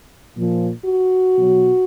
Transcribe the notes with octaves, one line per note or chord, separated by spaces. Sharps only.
A#2 F3
F#4
B2 F#3